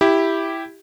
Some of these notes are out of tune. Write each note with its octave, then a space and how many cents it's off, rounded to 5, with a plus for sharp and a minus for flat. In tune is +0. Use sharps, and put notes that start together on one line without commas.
E4 +0 G4 +0